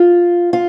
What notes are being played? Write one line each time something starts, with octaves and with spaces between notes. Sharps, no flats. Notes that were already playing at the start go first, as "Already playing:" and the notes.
Already playing: F4
F4